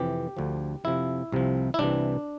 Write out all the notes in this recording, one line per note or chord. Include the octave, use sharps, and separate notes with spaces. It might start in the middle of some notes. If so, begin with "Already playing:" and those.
Already playing: F2 C3 E3 G4
D2 D3 F3
F2 C3 F3 E4
C2 C3 F3
E4
C2 C3 E3 D4